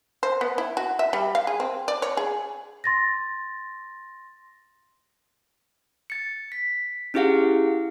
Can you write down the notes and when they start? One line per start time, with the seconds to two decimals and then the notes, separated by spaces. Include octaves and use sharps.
0.23 C5
0.41 B3
0.58 E4
0.77 F#4
0.99 E5
1.13 G3
1.35 F5
1.47 G#4
1.60 C4
1.88 D5
2.02 C#5
2.17 G#4
2.84 C6 A6 A#6
6.10 A6 C#7
6.52 B6
7.14 C#4 E4 G4 G#4 F5 F#5